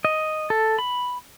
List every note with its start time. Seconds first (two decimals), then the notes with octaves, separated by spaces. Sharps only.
0.05 D#5
0.50 A4
0.79 B5